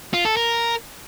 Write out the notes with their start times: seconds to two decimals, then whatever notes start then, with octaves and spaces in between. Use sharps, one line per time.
0.13 F4
0.25 A4
0.37 A#4